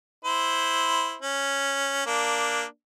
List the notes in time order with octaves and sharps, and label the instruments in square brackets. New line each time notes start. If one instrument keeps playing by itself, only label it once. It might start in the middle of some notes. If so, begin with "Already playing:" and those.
[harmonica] E4 C5
C#4
A#3 D4